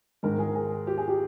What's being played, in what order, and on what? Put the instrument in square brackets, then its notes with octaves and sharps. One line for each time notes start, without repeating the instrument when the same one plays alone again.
[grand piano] G#2 D#3 G#3 A#4
G#4
G#4
G4
G#4
G4